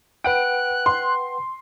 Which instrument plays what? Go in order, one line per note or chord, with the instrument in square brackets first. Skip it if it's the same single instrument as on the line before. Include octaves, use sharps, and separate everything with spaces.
[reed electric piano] B4 F#5 G5 [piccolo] F#6 [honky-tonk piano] D7
[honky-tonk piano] C6